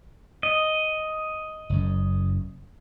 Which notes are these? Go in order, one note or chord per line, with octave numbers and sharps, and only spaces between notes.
D#5
F#1 F#2